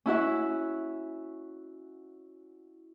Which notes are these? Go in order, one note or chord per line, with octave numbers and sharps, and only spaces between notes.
C#4 E4 F#4 E5